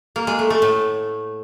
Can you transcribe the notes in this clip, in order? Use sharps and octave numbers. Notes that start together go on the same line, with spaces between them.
A#3
G#3
A3
A3
A2